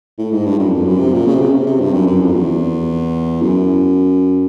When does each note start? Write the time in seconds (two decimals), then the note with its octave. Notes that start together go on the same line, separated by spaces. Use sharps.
0.18 A2
0.32 G#2
0.46 G2
0.59 F#2
0.73 F2
0.85 F#2
0.99 C3
1.13 A#2
1.26 C#3
1.35 C3
1.40 C#3
1.53 C3
1.66 C3
1.80 G2
1.93 F#2
2.07 F#2
2.20 F2
2.34 E2
3.41 F#2